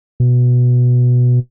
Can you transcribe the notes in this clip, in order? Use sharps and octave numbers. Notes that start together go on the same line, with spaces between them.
B2